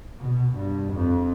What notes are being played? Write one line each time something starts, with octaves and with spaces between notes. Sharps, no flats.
B2
G2
F2